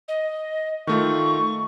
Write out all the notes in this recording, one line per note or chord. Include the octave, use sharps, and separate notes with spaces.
D#5
D#3 A3 F4 C#6